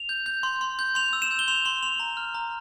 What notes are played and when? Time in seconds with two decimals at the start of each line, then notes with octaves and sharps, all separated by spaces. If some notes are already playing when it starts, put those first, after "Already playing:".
Already playing: F7
0.09 G6
0.26 G6
0.43 C6
0.61 C6
0.79 G6
0.95 C6 F7
1.13 E6
1.22 E7
1.31 G6
1.39 G7
1.48 C6 F7
1.65 C6 G7
1.83 C6 F7
2.00 A#5
2.17 F6
2.34 A#5